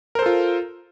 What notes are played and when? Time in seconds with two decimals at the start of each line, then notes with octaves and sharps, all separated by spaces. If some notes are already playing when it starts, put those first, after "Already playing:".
0.15 A#4
0.19 C5
0.22 A4
0.26 F4